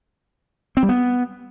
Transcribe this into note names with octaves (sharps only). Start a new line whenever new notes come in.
C4
G3
B3